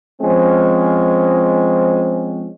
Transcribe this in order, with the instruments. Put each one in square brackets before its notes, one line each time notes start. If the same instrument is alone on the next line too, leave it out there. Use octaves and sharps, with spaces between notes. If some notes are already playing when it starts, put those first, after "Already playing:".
[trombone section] F3 G#3 C4 C#4